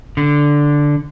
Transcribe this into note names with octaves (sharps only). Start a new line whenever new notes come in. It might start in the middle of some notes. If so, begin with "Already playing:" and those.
D3